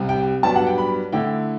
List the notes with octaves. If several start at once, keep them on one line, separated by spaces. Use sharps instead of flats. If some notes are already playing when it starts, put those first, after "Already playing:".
Already playing: C2 C3 G3
G5
G2 F#3 B3 D4 A5
F#5
G5
B5
D3 A3 E4 G5